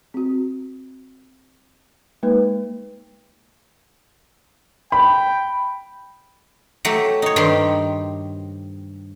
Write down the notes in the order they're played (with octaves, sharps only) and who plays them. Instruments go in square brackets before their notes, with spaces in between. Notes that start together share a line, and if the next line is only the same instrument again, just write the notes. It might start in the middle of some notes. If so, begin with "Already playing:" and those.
[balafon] C4 F#4
G#3 A#3 D#4 B4
[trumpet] G5 [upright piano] B5
[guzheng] F#3 A3 G4
D#4 C#5
G2 D#3 G4 C5 C6